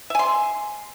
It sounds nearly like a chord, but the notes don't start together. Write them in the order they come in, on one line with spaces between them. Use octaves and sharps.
E5 G#5 C6